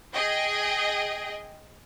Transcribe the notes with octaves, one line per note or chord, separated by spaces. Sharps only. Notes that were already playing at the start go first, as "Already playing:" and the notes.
G#4 D#5 G5